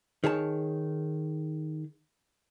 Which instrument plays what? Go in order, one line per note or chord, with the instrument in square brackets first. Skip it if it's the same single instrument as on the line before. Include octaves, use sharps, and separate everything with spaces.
[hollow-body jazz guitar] D#3 G#4 C#5 A5